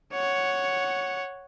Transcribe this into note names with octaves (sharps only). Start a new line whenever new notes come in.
C#5 F#5